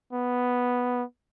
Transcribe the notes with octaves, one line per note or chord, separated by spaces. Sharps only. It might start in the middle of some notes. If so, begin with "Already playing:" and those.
B3